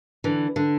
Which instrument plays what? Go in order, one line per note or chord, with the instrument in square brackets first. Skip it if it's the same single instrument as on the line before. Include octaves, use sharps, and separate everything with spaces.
[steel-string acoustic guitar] D3 E3
D3